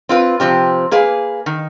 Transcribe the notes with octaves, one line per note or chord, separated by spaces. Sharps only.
C4 F4 B4
C3 F3 C4 G4
A#3 G#4 B4 F5
D#3